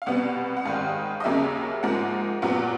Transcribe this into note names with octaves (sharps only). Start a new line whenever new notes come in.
F5
C2 B2 G3 B3 F#5
F#5
G#2 D#3 G3 F5
D#5
D#2 C#3 F#3 A#3 C#4 E5
G#2 F3 A#3 F#5
A#1 A#2 F#3 B3 F#5